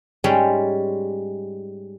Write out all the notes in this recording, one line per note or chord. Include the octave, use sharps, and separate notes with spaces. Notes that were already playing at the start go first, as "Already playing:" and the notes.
G#2 G3 G#3 C#4 C#5 G5